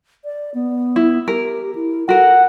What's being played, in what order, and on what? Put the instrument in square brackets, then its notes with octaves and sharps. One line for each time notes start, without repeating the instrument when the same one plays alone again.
[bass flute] D5
B3
[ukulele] E4
[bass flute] G4 [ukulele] A#4
[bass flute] E4
[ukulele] F#4 A#4 [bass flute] A4 [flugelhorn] F#5